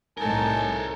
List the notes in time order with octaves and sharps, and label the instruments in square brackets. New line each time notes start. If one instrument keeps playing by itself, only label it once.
[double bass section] C2 A2 [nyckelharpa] D#4 A5 [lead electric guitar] A4 A#4 [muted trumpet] G#5